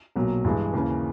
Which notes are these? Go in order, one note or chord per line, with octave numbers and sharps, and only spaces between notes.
B1 A#2 F#3
G2 E3 G#3
D#2 C#3 E3